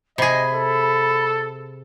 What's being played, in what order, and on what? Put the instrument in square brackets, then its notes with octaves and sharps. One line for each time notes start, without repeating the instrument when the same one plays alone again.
[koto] C3 G#4 [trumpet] D#5 [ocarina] B5
[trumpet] A4